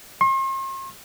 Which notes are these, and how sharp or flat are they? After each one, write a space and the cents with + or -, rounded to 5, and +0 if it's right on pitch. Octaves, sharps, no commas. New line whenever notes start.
C6 +45